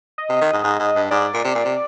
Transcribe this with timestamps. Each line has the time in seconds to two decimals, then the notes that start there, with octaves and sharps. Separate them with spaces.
0.18 D#5
0.29 C3
0.41 D#3
0.53 G#2
0.64 G#2
0.80 G#2
0.95 G2
1.11 G#2 D5
1.34 A#2
1.44 C3
1.55 A#2
1.65 C3